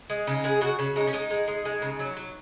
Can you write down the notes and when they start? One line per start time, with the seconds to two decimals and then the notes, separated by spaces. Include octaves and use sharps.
0.10 G#3
0.27 C#3 D#4
0.44 G#3 G#4
0.61 C#3 F#4
0.79 C#3 F#4
0.96 G#3 D#4
1.07 C#4
1.13 G#3 D#4
1.31 G#3
1.48 G#3
1.65 G#3
1.82 C#3
1.99 F#3
2.17 F#3